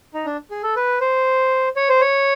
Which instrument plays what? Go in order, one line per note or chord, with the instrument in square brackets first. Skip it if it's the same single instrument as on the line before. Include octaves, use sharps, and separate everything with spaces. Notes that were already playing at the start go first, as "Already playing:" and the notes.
[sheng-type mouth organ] D#4
D4
G#4
A4
B4
C5
C#5
C5
C#5